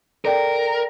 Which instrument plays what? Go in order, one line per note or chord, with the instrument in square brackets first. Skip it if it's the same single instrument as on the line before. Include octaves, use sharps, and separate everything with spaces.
[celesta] A4 D5 G5 [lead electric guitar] A#4